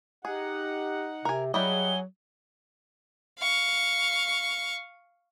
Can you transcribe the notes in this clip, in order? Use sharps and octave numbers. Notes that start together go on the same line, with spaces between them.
D#4 G4 G#4 F#5
C3 A#4 G#5
F#3 G3 E4 G#4 D#5 F#5 G#5 G7
F5 C#6